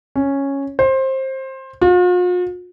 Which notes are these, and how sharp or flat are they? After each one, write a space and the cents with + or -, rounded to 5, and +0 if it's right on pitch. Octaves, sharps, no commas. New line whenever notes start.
C#4 -5
C5 +20
F4 +45